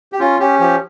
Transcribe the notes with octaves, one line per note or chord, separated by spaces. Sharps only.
G4
C#4 F4
C#4 G4
F3 G4